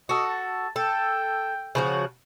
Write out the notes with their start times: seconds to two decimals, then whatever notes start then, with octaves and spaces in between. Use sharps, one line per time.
0.09 F#4 A4 D#5
0.29 A5
0.76 A4 G5
1.75 C#3 F3 F#4